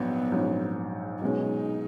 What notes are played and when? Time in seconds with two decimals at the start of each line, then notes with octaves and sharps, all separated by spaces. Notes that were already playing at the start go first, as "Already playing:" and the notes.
Already playing: A#1 G#2 F#3 B3
0.32 A#1 G#2 F#3 C#4
1.21 B1 B2 G#3 C#4 D#4